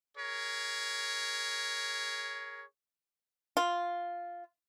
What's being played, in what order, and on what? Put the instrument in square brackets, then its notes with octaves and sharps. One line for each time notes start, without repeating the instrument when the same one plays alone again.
[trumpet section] G#4 A#4 C#5
[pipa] F4